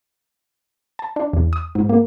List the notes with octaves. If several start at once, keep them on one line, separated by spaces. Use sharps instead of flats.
A5
D4
E2
D#6
G#2
A#3